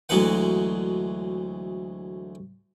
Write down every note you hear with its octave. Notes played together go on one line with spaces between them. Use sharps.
D2 E3 F#3 G#3 B4 F#5